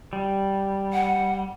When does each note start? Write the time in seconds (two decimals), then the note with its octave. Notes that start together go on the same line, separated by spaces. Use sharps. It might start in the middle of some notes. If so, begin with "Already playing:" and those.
0.13 G3
0.93 F#5